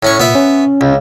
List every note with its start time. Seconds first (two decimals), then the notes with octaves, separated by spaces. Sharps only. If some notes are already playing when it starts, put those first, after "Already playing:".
0.03 A2 C#4 C#6
0.20 A#2 B3 E5
0.35 C#4
0.81 C#2